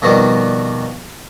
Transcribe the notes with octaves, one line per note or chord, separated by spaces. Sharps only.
F2 B2 D#3 G3